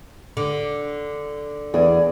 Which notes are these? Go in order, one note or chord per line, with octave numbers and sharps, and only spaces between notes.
D3
E2 G#4 D5